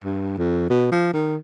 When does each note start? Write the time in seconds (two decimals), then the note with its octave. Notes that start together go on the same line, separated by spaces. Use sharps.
0.04 G2
0.38 F2
0.70 B2
0.92 F3
1.14 D#3